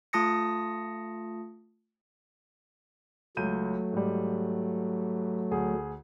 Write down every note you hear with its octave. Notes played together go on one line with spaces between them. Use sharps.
A3 F4 A5 D#6 A#6 C#7
C#2 F#3 A3 G6 D#7
G#2 G3
D2 G#4